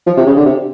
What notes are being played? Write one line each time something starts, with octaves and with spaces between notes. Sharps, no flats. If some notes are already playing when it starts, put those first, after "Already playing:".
F3
C3
C#3
D3
C3